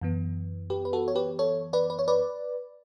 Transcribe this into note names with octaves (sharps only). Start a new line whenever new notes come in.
F#2 E3 B3
G4 B4
B4
F#4 A4
C#5
G4 B4
A4 C#5
B4 D5
B4
C#5
B4 D5